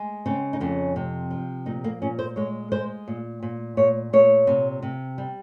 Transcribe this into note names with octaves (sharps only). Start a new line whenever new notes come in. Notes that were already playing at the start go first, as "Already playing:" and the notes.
Already playing: G#3
C#3 C4
D#4
F2 C#4
C3
F3
A#2 D#4
A#3
A#2 C#4
C5
G#3 C#5
G#3 C5
A#2
A#2
A#2 C#5
A#2 C#5
C3
C3
G3